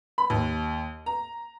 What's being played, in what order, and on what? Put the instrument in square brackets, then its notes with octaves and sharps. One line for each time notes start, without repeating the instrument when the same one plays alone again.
[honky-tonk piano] B5
D#2
A#5